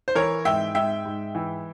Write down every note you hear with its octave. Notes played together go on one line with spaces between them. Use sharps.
C5
E3 A#4 C#5
G#2 E5 G5
G#2 E5 G5
G#2
E3